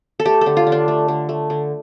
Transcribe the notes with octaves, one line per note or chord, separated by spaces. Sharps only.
A4
A3 G4
D3 A4
F4
D3
D4
A3
D3
A3
D3